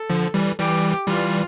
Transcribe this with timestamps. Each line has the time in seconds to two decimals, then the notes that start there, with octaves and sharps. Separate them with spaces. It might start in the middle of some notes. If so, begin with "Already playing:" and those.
Already playing: A4
0.10 D3 F3
0.34 E3 G3
0.59 E3 G3 G4
1.08 E3 G3 F4